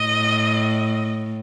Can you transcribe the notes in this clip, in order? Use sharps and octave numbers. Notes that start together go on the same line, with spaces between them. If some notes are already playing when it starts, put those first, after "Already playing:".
Already playing: A2 D#5